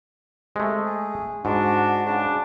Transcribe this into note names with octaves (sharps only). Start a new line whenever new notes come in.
C3 G#3 A3
G#4
G#2 D4 F#4
C#3 D4